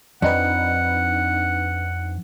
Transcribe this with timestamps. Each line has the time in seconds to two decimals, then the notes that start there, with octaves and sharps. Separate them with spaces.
0.22 F2 D4 D#4 B4 F#5